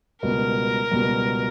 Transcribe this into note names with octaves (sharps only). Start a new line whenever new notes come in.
C#2 B2 G3 A#4
C#2 B2 G3